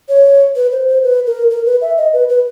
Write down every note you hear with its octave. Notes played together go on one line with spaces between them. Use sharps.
C#5
B4
C5
C5
B4
A#4
A#4
B4
E5
D#5
B4
B4